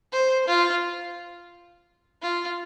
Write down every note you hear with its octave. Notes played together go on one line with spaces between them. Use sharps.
C5
F4
F4